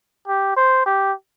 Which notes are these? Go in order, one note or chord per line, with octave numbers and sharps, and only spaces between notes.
G4
C5
G4